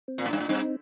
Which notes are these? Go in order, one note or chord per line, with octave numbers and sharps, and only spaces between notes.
C4
A#2
A2
G2 D4
A2
G2 C4 D#4